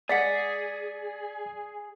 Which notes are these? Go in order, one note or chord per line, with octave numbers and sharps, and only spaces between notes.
G#3 G#4 D5 F#5 A6 B6 C#7